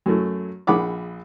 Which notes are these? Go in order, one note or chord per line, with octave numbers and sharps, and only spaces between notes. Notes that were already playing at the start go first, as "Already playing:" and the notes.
F#2 F#3 A3
A#1 G#4 F#5 B5 D6